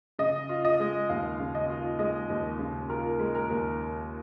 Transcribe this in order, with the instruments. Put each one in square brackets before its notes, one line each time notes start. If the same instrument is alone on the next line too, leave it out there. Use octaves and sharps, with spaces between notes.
[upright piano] C#3 [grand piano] D#5
[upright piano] F4
[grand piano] D#5
[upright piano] G#3
[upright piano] D#2 [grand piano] F5
[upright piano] C#3
[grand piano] D#5
[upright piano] F4
[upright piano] G#3 [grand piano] D#5
[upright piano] D#2
C#3
[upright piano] F4 [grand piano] A#4
[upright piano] G#3
[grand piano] A#4
[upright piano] D#2